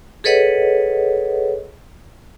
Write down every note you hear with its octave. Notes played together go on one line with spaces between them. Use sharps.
G#4 A4 B4 C#5 D#5 F#5